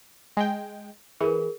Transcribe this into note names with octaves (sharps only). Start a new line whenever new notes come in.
G#3 G5
E3 G#4 A#4